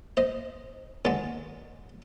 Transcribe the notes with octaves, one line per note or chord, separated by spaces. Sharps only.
C5 D#5
D#2 D3 G#3